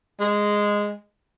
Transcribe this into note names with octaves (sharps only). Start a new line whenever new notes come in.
G#3